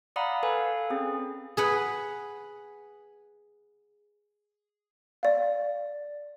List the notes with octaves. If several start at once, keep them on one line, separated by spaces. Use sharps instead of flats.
D5 F5 F#5 A#5 B5 D#6
A4 B4 F5 G#5 B5
C4 C#4 G#4
G#4 B4 F#5
D5 F5